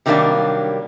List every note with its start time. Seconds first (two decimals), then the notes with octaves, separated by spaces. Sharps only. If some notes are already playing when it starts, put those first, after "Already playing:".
0.06 C3 D#3 F#3 G3 A#3 D4